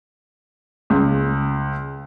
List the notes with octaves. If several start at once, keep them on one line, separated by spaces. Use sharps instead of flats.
C#2